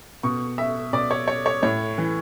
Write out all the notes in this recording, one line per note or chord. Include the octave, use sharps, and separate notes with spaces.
B2 C#6
E5
B2 D5
C#5
C#5
C#5
A2 C#5
E3